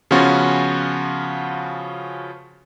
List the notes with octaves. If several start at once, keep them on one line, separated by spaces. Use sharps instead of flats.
C#3 F3 B3 C#4 F4 F#4